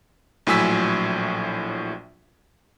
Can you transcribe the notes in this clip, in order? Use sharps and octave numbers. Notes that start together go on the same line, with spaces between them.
A#1 A2 F#3 G#5 E6 B6